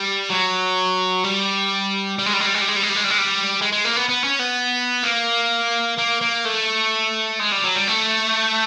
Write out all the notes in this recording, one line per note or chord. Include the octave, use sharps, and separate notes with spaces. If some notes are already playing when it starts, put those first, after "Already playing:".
Already playing: G3
F#3
G3
G3
G#3
G3
G#3
G3
G#3
G3
G#3
G3
G#3
G3
G#3
G3
G#3
G3
G#3
G#3
A#3
B3
B3
C#4
B3
A#3
A#3
A#3
A3
G#3
G3
F#3
G3
A3